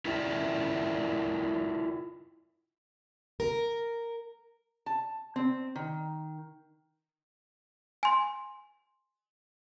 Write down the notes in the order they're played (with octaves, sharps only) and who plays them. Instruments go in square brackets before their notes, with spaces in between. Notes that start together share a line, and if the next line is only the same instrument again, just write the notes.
[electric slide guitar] E4 F4 A#4 D5 E5
[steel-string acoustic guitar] A#4
[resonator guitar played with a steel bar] A5
C4
D#3
[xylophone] G#5 C6